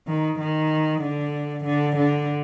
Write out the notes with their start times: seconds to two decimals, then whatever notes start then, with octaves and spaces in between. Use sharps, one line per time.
0.08 D#3
0.40 D#3
1.02 D3
1.65 D3
1.97 D3